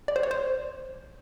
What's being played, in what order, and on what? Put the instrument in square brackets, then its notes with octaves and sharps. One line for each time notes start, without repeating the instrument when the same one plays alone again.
[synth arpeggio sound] D5
C5
C#5
C5